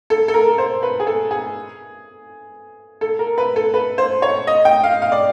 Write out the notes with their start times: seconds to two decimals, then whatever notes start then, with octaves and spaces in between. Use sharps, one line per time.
0.10 A4
0.28 A4
0.34 A#4
0.58 C5
0.83 B4
1.00 G#4
1.07 A4
1.31 G#4
3.01 A4
3.19 A#4
3.38 B4
3.56 A4
3.74 B4
3.98 C5
4.22 C#5
4.47 D#5
4.65 G5
4.84 F5
5.02 F5
5.12 D5